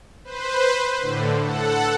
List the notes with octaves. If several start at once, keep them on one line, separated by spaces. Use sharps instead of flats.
B4 C5
A2 D3
A4 F#5